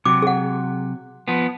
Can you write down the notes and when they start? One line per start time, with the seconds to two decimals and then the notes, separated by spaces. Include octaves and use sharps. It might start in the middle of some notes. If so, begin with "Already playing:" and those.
0.05 C3 F#3 D6
0.22 G#4 F#5
1.28 F3 B3